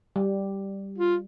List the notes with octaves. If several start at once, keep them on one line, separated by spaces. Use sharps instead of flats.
G3
F4